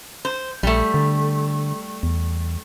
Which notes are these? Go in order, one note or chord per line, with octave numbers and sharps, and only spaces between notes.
C5
A#1 G3 A3
D3
E2